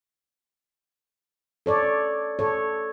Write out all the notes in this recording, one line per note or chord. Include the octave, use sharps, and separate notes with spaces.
A4 C#5 D5
A4 C#5